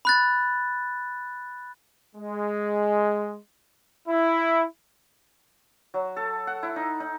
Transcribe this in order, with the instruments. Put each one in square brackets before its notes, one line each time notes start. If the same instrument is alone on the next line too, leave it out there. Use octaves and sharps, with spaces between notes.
[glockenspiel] B5 F#6 A6
[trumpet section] G#3
E4
[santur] F#3
A4
F#5
E4
D#4
D#4